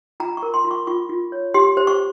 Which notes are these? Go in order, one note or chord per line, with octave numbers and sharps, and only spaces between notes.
F4 A#5
C#6
A#4
C6
F4
C#6
F4 C#6
F4
C#5
G4 C6
C5
C#6